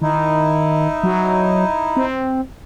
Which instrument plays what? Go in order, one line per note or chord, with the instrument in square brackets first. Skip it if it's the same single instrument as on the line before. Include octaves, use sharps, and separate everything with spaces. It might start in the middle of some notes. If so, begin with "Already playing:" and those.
[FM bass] D#3 [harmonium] D#4 E4
[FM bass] F#3
C4